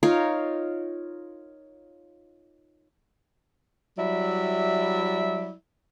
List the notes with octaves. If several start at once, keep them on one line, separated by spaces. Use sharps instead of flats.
D#4 F4 A#4 C#5
F#3 G3 E4 D5 E5